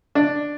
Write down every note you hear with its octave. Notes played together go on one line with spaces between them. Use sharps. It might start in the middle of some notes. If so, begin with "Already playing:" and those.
D4